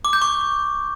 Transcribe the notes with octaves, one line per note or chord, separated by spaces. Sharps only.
D6
G6
C#6